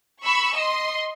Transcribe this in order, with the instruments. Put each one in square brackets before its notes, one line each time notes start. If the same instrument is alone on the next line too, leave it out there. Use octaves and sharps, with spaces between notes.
[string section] B5 C#6 E6
D#5 C6